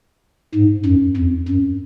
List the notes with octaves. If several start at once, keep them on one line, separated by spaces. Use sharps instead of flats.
G#2
F#2
F2
F#2